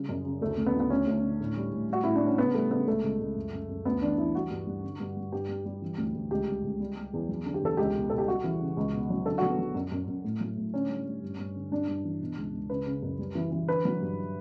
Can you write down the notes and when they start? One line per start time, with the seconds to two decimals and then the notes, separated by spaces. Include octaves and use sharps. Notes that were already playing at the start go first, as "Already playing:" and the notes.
Already playing: C#3 G3
0.09 F#2
0.25 C#3
0.41 D2 A3
0.58 D2
0.66 B3
0.74 D2
0.80 B3
0.90 D2 C#4
1.07 D2
1.23 D3
1.40 A2
1.57 G3
1.73 A2
1.89 G3 F#4
2.04 A2 E4
2.15 D4
2.22 G3 C#4
2.38 C#3 B3
2.54 G3 A3
2.70 C#3 B3
2.87 C#2 A3
3.04 C#2
3.20 C#2
3.36 F#2
3.53 F#2
3.69 F#2
3.85 D2 B3
4.02 E3 D4
4.18 E3 E4
4.35 G3 F#4
4.50 G2
4.67 G2
4.84 D3
5.00 G2
5.17 G3
5.32 G2 G4
5.49 G3
5.66 G3
5.82 E3
5.98 D2
6.15 D2
6.31 C#2 G4
6.48 G3
6.64 C#2
6.80 G3
6.97 G3
7.13 E2
7.29 F#3
7.46 D3
7.54 G4
7.62 E2 A4
7.77 C#2 G4
7.95 B2
8.10 B2 A4
8.18 G4
8.27 G3 F#4
8.44 E3
8.60 C#3
8.77 C#2
8.94 B2
9.10 F#3
9.26 D3 A4
9.38 F#4
9.42 F#3
9.50 B3
9.58 F#3
9.74 F#2
9.92 F#2
10.07 F#2
10.24 A2
10.40 F#3
10.57 A2
10.73 D3 C#4
10.89 G3
11.07 G3
11.22 G2
11.39 G2
11.56 D3
11.72 G2 D4
11.88 G2
12.04 E3
12.20 B2
12.37 C#2
12.53 C#2
12.70 C#3 B4
12.87 C#3
13.02 F#2
13.19 G3
13.35 E3
13.52 E3
13.68 D3 B4
13.85 F#3
14.01 G2